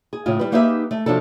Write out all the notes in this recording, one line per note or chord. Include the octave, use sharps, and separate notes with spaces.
G#4
A2 C#3 F4
G3 B4
A#3 D#4 G4 G#4 B4 E5
A3
C3 F3 F#3 D4 A4